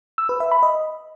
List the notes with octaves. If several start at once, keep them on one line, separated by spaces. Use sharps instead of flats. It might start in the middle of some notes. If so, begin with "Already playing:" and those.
E6
B4
E5
B5
D#5